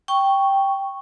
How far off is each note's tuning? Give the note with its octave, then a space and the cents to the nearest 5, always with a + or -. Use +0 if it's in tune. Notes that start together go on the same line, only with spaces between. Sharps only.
G5 +0 C#6 +0